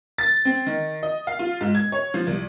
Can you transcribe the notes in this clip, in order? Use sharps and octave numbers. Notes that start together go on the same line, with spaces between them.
A6
C4
D#3
D#5
F5
F4
G#2
G#6
C#5
F3
C2